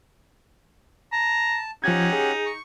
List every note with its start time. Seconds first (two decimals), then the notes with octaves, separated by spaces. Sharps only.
1.12 A5 A#5
1.84 F3 C#4 D#4 G4 F#5 G#6
2.13 G#4
2.46 C#6